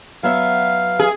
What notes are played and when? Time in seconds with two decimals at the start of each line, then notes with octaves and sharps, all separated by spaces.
0.23 F#3 B3 E5 F5
0.99 G#4